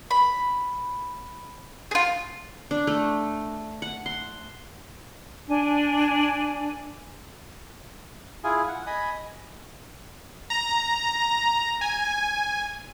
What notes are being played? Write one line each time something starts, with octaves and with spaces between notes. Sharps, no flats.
B5
F4 G#4
D4
A3
F#5
C6
D4 G#5
E4 F4 G#4 G#5
F#5
D#5 G#5 B5 D#6
A#5
G#5